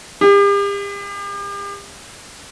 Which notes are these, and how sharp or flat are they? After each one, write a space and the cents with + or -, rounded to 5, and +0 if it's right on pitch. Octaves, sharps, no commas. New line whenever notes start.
G4 +40